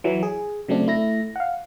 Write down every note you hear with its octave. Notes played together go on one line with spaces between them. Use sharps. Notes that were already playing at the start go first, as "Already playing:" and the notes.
E3 F#3
G#4
C#3 F#3 A3 C4 D4
A3 E4 A#6
F5 F#5